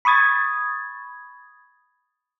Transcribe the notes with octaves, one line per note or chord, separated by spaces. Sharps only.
B5 C#6 D#6 G#6 A6